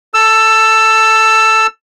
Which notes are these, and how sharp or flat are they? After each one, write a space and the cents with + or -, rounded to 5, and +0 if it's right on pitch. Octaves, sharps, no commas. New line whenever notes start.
A4 +0 E6 +15